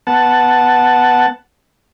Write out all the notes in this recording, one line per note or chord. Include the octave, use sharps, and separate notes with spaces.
B3 F#5 A5